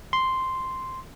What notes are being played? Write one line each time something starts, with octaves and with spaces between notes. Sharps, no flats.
C6